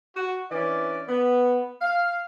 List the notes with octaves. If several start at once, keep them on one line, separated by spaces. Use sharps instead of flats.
F#4
E3 C#4 D4 D5
B3
F5